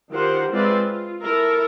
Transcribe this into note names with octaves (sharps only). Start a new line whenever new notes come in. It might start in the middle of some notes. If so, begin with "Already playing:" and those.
D#3 F4 G4 A#4 C5 F#5
G#3 C4 F4 B4 D5 E5
F4
E4 A4 A#4 E5